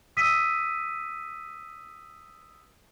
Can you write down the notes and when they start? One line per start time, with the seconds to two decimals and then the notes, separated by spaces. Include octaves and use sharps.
0.17 D#6 E6 B6 D#7